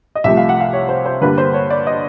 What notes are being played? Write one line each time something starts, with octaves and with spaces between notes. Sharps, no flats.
D#5
C2 C3 F3 A3 E5
F5
F#5
F5
C#5
C5
C5
G2 D3 G3 A#3 B4
C5
C#5
D5
D#5